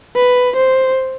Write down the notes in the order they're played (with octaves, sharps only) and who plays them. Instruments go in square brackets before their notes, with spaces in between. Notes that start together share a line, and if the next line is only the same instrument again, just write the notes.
[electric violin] B4
C5